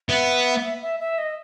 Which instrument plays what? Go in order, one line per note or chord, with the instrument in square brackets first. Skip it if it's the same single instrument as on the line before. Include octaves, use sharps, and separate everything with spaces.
[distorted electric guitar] B3 [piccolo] E5
[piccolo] E5
E5
D#5